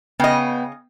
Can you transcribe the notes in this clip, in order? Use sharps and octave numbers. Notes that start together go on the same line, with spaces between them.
C#3 B3 D#5 G5